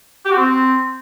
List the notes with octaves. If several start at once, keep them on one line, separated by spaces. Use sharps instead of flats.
G4
F#4
C4